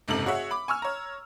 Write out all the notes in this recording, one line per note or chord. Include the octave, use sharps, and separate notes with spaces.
F#1 G#2 C3 A4 F#7
F#4 G#4 C#5 E5 F#5
B5 D6
G#5 C#6 E6 F6
C#5 A#5